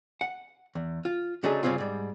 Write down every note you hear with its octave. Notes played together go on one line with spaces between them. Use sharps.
F#5
E2
F4
C#3 F#3 A3 D4 D#4 G#4
G2 C#3 G3 C4 C#4 F4
G#2 G3